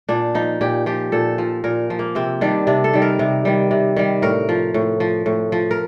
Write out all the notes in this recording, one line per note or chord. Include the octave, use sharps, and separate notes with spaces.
A#2 D4
F3 D#4
A#2 G4
F3 G4
A#2 A4
F3
A#2 A#4
F3
A#3
C3 C4
D#3 G3 D4
C3 D4
A4
D#3 G3
A#4
C3
D#3 G3
C3
D#3 G3
A2 A#4
F3
A2
F3
A2
F3
A#4